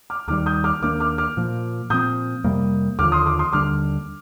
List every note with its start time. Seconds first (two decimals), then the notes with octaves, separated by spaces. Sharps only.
0.10 D6 F6
0.28 D#2 D#3 G3 D6 F6
0.46 D#6 G6
0.64 D6 F6
0.82 D#2 D#3 A#3 D4 D6 F6
1.00 D6 F6
1.18 D6 F6
1.37 A#2 F3 A#3
1.90 A#2 F3 C4 D#6 G6
2.44 F2 C3 G3 A#3
2.99 D#2 D3 F3 D6 F6
3.12 C6 D#6
3.26 D6 F6
3.39 C6 D#6
3.53 D#2 D3 G3 D6 F6